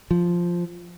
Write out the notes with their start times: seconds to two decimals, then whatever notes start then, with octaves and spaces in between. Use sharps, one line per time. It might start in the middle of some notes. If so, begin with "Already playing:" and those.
0.11 F3